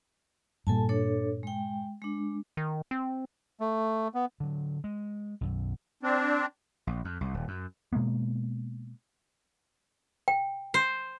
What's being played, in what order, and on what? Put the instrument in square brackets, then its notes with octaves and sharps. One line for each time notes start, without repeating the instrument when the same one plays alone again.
[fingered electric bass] G2 A#2 G3 [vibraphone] A4 G#5 A5
[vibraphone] D4 A4 C#5
G#3 G5
G#3 D4
[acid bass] D#3
C4
[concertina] A3
B3
[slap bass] D3 F#3
G#3
B1 F#2
[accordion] C4 D4
[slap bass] A#1
F2
C2
D#1
F#2
[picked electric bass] B2 G#3 A#3 B3
[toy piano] G5
[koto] C5